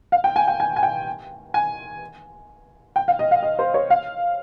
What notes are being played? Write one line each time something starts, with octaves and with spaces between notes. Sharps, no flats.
F5
G5
G#5
G5
G#5
G#5
G5
G#5
G5
F5
D#5
F5
D#5
C5
C#5
F5